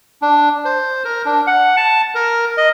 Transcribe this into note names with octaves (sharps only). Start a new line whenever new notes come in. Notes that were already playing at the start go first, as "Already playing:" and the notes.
D4
C5
A#4
D4
F#5
A5
A#4
D#5